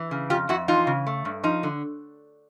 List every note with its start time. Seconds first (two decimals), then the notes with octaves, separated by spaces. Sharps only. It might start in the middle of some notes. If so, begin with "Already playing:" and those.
Already playing: E3
0.11 C#3
0.30 F2 F4 G4
0.49 F2 E4 F#4
0.68 E3 D#4 F4
0.87 C#3
1.07 A3
1.25 G2
1.43 F3 D#4
1.63 D3